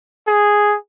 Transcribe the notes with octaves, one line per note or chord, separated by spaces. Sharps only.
G#4